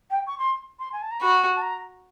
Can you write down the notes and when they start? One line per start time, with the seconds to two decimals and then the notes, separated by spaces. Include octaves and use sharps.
0.11 G5
0.27 C#6
0.38 C6
0.79 C6
0.92 G#5
1.02 A5
1.11 A#5
1.20 F#4 B5
1.56 A5
1.62 A#5